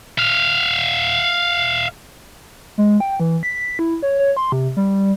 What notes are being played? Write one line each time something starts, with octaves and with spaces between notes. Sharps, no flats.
E5 F5
G#3
G5
E3
B6
E4
C#5
C#5
C6
C3
G3